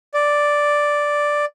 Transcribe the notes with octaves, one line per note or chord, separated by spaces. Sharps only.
D5